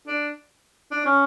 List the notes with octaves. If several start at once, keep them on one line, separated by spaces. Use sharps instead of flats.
D4
D4
C#4